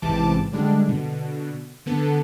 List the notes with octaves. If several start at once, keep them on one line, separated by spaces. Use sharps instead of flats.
A1 G#2 C3 E3 A5 D6
D3 G3 G#3 D4
B2 D3
D3 B3 A4